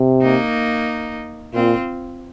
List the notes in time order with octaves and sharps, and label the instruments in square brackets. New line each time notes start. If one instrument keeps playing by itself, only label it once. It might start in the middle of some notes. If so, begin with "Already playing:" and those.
Already playing: [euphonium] C3
[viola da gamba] A#3 D#4
[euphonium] A#2 [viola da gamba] C4 F4